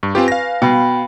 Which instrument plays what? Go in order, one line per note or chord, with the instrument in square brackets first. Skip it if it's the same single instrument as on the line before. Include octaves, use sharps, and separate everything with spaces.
[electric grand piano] G2 [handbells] C#6
[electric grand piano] C4 F4 G4 [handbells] B4 G#5
[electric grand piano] F5 A#6
[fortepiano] B2 [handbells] G5 B5